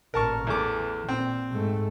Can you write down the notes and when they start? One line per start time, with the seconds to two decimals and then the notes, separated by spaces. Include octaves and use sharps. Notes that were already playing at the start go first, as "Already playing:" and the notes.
0.14 A1 A#2 A#4 A5 C#6
0.47 E2 E3 A3 D6
1.09 A#2 C4
1.51 G#2 A3